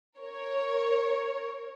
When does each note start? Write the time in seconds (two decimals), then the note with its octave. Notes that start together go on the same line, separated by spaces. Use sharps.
0.19 A#4 C#5